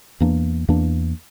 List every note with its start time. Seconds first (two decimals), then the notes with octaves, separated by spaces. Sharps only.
0.20 E2 E3 A#3 D4
0.68 E2 E3 A#3 D4